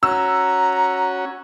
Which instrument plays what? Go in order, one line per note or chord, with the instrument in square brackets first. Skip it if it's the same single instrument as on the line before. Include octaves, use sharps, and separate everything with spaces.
[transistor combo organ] C#4 F#4 [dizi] A#5 [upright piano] E6